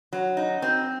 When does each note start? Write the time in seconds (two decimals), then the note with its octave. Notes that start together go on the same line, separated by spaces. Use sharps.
0.13 F#3
0.37 D#4
0.62 C4